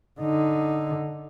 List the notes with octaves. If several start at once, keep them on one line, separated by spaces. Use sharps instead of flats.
D3 D#4